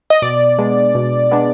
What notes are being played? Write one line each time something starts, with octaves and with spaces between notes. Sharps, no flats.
D#5
B2 D5
G#3 B3 D4
B2
G#3 B3 D4